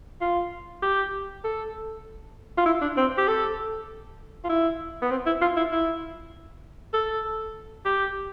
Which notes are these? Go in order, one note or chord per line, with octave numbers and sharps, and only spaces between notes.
F4
G4
A4
F4
E4
D4
C4
G4
A4
F4
E4
B3
C4
E4
F4
E4
E4
A4
G4